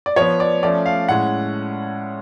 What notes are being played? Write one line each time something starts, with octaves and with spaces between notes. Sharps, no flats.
D5
F3 B3 C#5
D5
F3 A3 C#4 D5
F5
A2 G#3 C#4 F#5